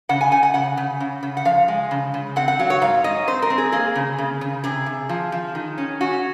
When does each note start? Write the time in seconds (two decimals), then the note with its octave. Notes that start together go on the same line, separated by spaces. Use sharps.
0.09 C#3 F#5
0.21 G#5
0.32 C#3 G#5
0.43 F#5
0.54 C#3 F#5
0.77 C#3
1.00 C#3
1.23 C#3
1.37 F#5
1.45 F3 F5
1.68 G#3
1.91 C#3
2.14 C#3
2.36 C4 F#5
2.48 F#5
2.59 F#3 F5
2.70 C#5
2.81 G#2 F5
3.04 G#2 D#5
3.28 C4 C5
3.42 A#4
3.50 C4
3.58 G#4
3.72 A#3 G#4
3.96 C#3
4.18 C#3
4.41 C#3
4.64 C3 G#4
4.86 C3
5.09 F3
5.32 F3
5.55 D#3
5.78 C#4
6.01 C#4 F#4